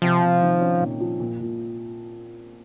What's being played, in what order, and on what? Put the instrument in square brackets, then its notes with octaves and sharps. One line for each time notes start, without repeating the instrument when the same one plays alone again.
[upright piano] C3 [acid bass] F3
[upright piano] C3
D#3
C#4
A#2
F3
A#2
A#2